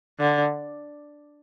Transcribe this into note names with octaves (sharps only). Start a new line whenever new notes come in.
D3